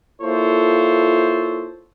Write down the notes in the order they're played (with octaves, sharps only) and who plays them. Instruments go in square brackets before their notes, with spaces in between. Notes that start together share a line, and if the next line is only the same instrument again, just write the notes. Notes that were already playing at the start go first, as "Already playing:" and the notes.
[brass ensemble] A#3 E4 F4 A4 C5 C#5